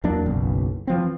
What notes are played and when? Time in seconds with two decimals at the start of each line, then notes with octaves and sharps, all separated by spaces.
0.04 E2 F#3 A#3 D4
0.26 F#1 B1
0.87 E3 F3 C4